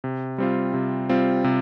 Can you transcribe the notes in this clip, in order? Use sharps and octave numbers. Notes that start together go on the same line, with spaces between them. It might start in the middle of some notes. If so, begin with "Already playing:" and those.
C3
G3 C4 F4
C3
G3 C4 F4
C3